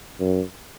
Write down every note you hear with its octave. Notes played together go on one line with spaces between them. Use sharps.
F#2